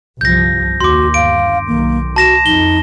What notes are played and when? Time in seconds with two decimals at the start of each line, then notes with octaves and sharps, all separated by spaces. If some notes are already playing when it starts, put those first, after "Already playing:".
0.21 G1 C2 F3 G6 A#6
0.80 D#2 F#4 C6 D6
1.14 G1 F5 D7
1.67 B1 D#3 A#3
2.16 F#4 A5 A#6 E7
2.46 F2 D#4 G7